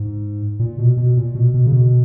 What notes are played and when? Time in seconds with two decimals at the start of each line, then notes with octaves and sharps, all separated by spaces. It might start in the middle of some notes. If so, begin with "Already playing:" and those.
Already playing: G#2
0.59 A#2
0.78 B2
0.97 B2
1.17 A#2
1.35 B2
1.54 B2
1.66 C#3
1.72 B2